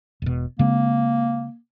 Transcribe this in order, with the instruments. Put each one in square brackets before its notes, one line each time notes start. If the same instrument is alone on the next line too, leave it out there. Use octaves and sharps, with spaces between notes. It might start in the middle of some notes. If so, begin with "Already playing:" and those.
[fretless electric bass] E1 B2
[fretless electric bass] C#3 G#3 C4 [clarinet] A#3